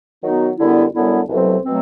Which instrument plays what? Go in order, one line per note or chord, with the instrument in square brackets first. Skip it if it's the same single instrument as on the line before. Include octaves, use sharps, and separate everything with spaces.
[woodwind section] D#3 F#3 B3 D#4 F#4
F#2 D3 G3 B3 E4
F#2 D3 G3 B3 E4
C2 B2 F#3 A3 C4
B2 F#3 A3 C4